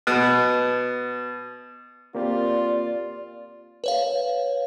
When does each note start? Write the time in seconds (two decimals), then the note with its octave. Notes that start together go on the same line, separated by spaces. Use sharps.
0.07 B2
2.15 A#3 C4 F4 G4 D5
3.84 B4 C#5 F5